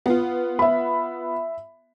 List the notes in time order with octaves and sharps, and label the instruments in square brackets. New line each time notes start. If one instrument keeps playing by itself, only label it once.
[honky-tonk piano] B3 F4
[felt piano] E5 B5